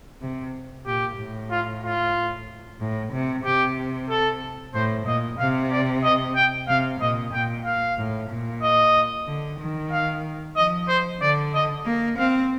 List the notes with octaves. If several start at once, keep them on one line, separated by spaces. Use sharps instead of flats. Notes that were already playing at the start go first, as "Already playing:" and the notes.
C3
A#2 G4
A2
F4
F4
A2
C3
C3 G4
A4
A2 C5
A#2 D#5
C3 F5
D5
D#5
G5
C3 F5
A#2 D#5
A#2 G5
F5
A2
A#2
D#5
D3
D#3
F5
F3 D#5
C5
D3 D5
D#5
A#3
C4 F5